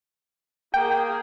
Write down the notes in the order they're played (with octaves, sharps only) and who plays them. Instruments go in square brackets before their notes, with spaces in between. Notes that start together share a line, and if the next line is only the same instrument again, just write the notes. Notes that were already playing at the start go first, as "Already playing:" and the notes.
[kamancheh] A#3 G#4 [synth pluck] G5